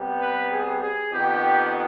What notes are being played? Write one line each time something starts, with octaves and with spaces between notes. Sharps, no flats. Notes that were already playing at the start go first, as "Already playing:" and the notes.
Already playing: C3 G3 B3
B4
G#4
G#4
F2 D#3 B3 G4